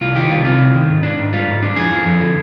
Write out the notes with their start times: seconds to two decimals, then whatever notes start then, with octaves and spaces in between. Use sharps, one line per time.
0.01 C2 F4
0.16 D#3 G4
0.30 C2 F4
0.45 C3 F4
0.60 C2
0.74 D#3
0.89 G#2
1.03 D4
1.18 G#2
1.33 G3 F4
1.48 G#2
1.62 D4
1.76 F2 G#4
1.91 F3
2.06 F2
2.21 D3